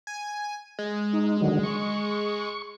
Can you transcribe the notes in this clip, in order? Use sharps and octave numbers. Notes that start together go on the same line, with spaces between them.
G#5
G#3
D#4
D3 D#3 F#3
C#6